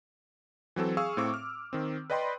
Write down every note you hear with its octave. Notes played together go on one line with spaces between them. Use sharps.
E3 F#3 C4 A4
G#4 F5 C#6 E6
A2 C4 C#6 D6
F6
D#3 C4
B4 D5 D#5 G5 B5 C6